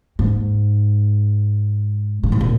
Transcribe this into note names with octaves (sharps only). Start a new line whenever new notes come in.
G#2
A#2
G#2
A#2